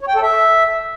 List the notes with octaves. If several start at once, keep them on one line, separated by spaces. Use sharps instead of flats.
C#5
G5
A4
E5